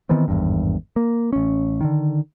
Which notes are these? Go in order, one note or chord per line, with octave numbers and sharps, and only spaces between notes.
D#3 E3 B3 C4
G#1 E2 G2
A#3
A1 C#4
D3 D#3